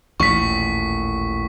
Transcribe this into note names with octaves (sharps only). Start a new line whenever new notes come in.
A1 D#2 A#2 C#6 B6